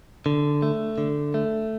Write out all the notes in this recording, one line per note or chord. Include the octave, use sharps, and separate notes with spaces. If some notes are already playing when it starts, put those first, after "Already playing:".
D3
A3
D3
A3